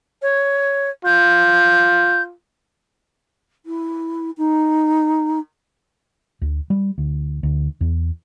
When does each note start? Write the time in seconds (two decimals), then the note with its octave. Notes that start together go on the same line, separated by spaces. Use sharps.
0.22 C#5
1.05 F4 G6
3.66 E4
4.38 D#4
6.42 D2
6.70 G3
6.98 D2
7.43 D2
7.81 E2